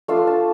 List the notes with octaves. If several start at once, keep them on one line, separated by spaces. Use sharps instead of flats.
A3 D4 F4 F5
A5